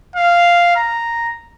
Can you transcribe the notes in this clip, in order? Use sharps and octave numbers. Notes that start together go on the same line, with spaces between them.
F5
A#5